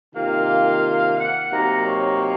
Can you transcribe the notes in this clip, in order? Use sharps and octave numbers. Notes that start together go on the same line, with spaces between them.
C3 D#3 A#3 F4 F5
F#5
C3 F#3 A#3 D#4 A#5
C#5